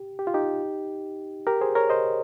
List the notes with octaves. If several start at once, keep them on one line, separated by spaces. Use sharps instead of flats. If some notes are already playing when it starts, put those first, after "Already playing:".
Already playing: G4
G4
F4
D#4 G4
G4 A#4
G#4 C5
A#4 C#5
C5 D#5